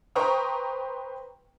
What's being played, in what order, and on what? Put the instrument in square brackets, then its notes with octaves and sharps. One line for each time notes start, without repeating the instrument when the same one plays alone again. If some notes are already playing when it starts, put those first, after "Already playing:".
[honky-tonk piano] B4 C5 G5 A#5 C#6 D#6